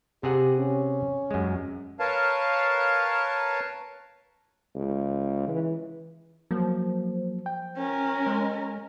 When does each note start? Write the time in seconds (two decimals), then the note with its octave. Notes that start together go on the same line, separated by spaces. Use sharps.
0.23 C3 G4 G#4 F#5
0.58 C#4
1.31 F#2 G#3
2.00 A#4 B4 C#5 F5 A5
4.75 C#2
5.48 E3
6.51 F3 F#3 A#3
7.46 G5
7.77 C#4 A#4
8.27 G#3